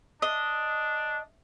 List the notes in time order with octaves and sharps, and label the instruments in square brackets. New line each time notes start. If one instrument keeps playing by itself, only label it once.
[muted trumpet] D4 [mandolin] D#5